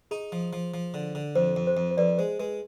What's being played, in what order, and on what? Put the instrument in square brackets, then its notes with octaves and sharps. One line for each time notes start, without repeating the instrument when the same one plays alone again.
[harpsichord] D#4 [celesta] G#4
[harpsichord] F3
F3
F3
D3
D3
[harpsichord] F2 [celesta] C5
[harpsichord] F2
[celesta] C5
[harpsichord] F2
[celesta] C5
[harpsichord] F2 [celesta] B4 D5
[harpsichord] G#3 [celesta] C5
[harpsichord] G#3 [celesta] B4